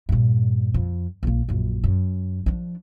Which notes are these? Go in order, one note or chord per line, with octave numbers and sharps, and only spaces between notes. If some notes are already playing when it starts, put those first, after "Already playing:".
G2 A#2
F2
A#1 A#3
A#1 F#2
F#2
F3 D4